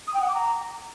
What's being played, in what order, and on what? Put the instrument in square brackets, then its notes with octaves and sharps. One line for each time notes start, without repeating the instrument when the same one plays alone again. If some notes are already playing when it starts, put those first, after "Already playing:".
[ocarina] D#6
G5
F#5
D6
A#5